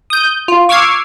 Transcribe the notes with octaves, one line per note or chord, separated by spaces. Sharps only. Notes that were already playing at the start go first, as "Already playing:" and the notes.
D#6 G6
F4
C#6 D6 E6 F6 G#6 C7